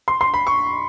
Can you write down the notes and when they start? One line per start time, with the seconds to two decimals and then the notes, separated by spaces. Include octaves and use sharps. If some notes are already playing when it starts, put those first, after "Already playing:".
0.08 C6
0.21 C6
0.34 B5
0.47 C#6